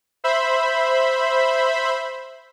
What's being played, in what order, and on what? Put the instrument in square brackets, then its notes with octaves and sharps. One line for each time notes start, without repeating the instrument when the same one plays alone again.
[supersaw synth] C5 E5 B5